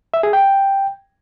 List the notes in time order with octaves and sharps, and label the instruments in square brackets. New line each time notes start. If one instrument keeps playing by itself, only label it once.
[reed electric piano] E5
G#4
G5